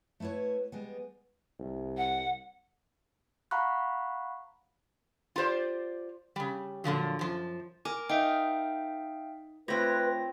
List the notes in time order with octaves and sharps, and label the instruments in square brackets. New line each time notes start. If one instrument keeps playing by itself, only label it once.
[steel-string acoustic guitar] A3 B3 E4 B4 C#5
G3 G#3 B3
[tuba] C2
[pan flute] F#5
[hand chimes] F5 F#5 A#5 B5 C#6 F#6
[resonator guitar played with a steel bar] F4 G4 A#4 C5 D5
C#3 G3
A#2 D3 F3 F#3
F#2 F3
[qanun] A#4 [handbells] G#5 D6
[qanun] D#4 [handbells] E5 F5 G5
[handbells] A3 F4 A#6 [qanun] C4 C#5 [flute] B4